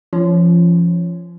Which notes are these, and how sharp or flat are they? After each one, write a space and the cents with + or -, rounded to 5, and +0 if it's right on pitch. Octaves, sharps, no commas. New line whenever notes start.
F3 -25 C#4 +0